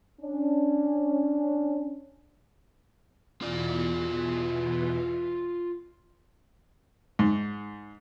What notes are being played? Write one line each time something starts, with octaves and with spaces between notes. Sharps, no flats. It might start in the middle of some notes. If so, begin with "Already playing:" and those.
C#4 D4
E2 B2 E3 F4 D5
G#2